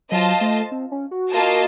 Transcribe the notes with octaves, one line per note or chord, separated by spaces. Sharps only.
F#3 F4 C5 D#5 A5
A3
C4
C#4
F#4
A#3 F4 A#4 D#5 A5